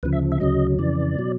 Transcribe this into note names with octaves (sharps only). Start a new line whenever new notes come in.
D2 C#3 F3 B4
E5
E5
D2 C#3 F#3 D#5
F2 C#3 E3 D5
B2 F#3